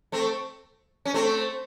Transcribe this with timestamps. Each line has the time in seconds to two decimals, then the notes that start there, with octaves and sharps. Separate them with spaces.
0.12 A3 C4
1.05 C#4
1.14 A3 C4